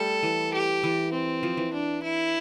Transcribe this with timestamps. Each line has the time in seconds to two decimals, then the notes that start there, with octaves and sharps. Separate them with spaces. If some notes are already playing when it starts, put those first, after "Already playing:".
Already playing: G3 A3 A4
0.23 E3
0.53 G4
0.84 E3
1.13 C4
1.43 F3
1.57 E3
1.73 D4
2.03 E4